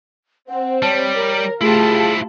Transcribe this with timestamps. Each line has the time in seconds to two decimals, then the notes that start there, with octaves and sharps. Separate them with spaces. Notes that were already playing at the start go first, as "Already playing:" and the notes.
0.49 C4 F#5
0.82 G3 C#5 A5
1.16 A#4
1.61 A3 E4 F4 G4 G#4 C5 A5